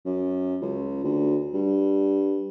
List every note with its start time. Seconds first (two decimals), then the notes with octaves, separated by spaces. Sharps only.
0.06 F#2
0.62 C#2
1.04 D2
1.54 G2